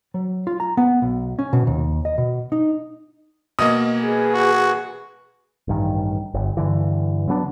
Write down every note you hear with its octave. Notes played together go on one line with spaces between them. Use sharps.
F#3
F4
A#5
B3
B1
C#4
B2
D#2
D#5
B2
D#4
B2 A#3 D#5 D#6
G#4 B4
F#4
A1 G2 D#3
G1
G2 D3 E3
C#3 F#3 B3 D4